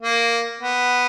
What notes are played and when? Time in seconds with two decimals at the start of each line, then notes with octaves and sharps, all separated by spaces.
0.02 A#3
0.61 B3